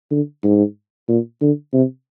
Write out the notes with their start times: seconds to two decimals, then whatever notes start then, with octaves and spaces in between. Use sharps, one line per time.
0.11 D3
0.44 G#2
1.08 A#2
1.41 D3
1.74 C3